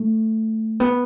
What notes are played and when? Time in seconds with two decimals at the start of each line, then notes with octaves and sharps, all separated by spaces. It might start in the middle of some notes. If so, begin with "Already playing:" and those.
Already playing: A3
0.80 B3